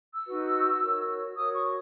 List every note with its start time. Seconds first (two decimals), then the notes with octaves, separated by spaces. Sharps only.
0.13 E6
0.26 D#4 F#4 B4
0.81 F#4 A#4 C#5
1.35 F#4 A#4 C#5 D#6
1.53 C#6